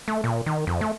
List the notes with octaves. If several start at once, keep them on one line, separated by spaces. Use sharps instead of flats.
A3
A#2
D#3
F2
A3